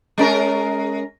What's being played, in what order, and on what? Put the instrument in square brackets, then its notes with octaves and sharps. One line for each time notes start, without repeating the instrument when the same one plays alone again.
[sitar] G#3 C#4 A#4